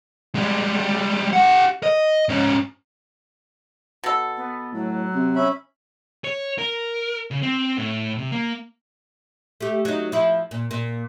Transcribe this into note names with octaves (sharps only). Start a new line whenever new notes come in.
G3 G#3
G4 F#5
D#5
G#2 C#4
B2 A4
B3
A2 F#3
C3
C#4 E5 B5
C#5
A#4
C#3
C4
A2
C3
A#3
A3 G4
F#3 D#4
F3 E4
A#2
A#2